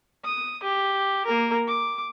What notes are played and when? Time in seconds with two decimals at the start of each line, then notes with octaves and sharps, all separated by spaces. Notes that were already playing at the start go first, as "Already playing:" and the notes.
0.24 D#6
0.63 G4
1.26 A#3 A#4
1.67 D6